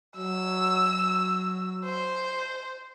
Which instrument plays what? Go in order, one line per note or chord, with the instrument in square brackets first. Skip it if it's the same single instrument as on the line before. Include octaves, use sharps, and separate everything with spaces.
[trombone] F#3 [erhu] E6
[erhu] C5